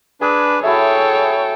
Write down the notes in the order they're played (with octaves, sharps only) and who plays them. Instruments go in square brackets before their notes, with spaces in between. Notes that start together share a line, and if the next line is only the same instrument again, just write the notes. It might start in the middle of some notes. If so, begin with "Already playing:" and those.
[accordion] D4 B4 [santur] G#4
[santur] E4 F#4 E5 [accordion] G#4 [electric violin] A4 G5 [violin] C#5